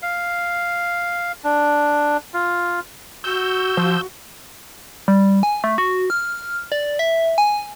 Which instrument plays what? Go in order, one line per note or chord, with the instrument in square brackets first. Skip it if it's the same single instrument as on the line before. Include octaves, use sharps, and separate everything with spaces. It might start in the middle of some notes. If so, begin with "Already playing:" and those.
[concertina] F5
D4
F4
[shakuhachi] F#4 [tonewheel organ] E6 G6
[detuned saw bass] F3
[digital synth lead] G3
G#5
A3
F#4
F6
D5
E5
G#5